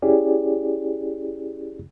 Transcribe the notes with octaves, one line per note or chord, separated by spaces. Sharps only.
C#4 E4 G4 G#4 D5